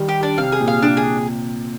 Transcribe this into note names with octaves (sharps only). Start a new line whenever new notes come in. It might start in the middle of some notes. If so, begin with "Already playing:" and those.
Already playing: D#3 G3
G4
D4
C3 F5
G#4
A#2
F5
C3 D4
G#4